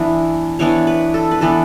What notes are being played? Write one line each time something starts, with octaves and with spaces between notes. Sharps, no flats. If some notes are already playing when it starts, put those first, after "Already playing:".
Already playing: E3 B3 D4 B4
E3 B3 D4 C#5
B4
A4
B4
E3 B3 D4 A4